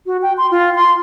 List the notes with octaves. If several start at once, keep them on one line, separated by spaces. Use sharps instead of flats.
F#4
G5
C6
F4
C6